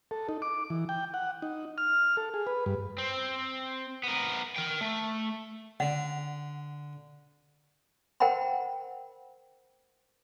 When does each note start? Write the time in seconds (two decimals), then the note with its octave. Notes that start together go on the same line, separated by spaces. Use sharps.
0.11 A4
0.29 D#4
0.42 D6
0.70 E3
0.89 G5
1.14 F#5
1.42 D#4
1.78 F6
2.17 A4
2.34 G#4
2.47 B4
2.66 G2
2.98 C4
4.04 B3 A#4
4.56 A#4 G5
4.81 A3
5.80 D3 F#5
8.20 A#4 C5 F#5 G5 A#5 B5